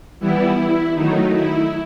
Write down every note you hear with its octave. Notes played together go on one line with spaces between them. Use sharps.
E3 G3 B3 E4
D#3 F#3 A3 D#4
E4